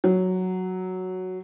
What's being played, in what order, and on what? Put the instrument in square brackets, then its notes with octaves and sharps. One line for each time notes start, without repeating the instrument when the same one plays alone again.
[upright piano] F#3